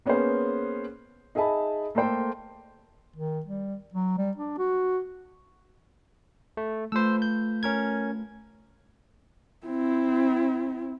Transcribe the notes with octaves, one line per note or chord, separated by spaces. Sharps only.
A#3 B3 C#4 G#4 B4 C5
D#4 G#4 E5 G#5 A5 B5
A3 A#3 A4 C5 G5
D#3
G3
F#3
G3
D4
F#4
A3
A3 F4 B4 C5 E6
G6
C#4 A#4 G#6
C4 E4